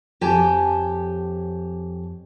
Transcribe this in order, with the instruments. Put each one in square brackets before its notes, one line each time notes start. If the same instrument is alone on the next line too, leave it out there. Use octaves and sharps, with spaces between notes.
[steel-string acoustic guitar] F2 G4 C#5 G#5 A5